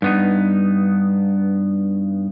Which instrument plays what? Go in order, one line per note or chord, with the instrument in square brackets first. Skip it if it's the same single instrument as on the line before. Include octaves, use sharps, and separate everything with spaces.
[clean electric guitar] G2 B3 D#4